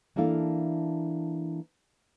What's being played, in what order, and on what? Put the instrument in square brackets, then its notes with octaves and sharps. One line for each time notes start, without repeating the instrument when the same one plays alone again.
[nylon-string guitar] E3 A#3 D4 E4 A4 F5